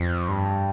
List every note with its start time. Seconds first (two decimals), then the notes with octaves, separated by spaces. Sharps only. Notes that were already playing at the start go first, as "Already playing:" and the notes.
Already playing: F2
0.28 G2